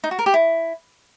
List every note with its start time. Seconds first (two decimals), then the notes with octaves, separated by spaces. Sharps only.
0.04 D#4
0.11 F#4
0.19 A#4
0.26 G4
0.34 E4